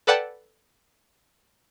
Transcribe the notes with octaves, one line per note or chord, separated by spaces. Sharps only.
A4 B4 D5 F#5 G5 A5